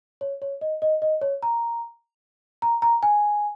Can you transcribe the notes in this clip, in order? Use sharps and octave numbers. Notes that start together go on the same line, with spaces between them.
C#5
C#5
D#5
D#5
D#5
C#5
A#5
A#5
A#5
G#5